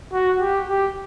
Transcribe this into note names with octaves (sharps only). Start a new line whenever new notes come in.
F#4
G4
G4